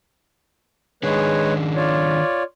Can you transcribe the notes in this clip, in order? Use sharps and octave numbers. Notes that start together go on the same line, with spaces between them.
D#3 G#3 D4 G#4 B4 C#5
F4 C#5 D5